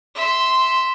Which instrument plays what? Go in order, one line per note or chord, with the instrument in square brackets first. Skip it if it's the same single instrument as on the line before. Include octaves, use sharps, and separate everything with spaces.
[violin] E5 C6